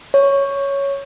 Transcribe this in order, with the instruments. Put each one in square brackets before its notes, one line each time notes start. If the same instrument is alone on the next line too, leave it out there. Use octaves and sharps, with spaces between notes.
[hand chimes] C#5